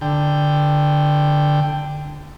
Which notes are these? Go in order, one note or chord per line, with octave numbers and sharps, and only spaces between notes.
D3 G5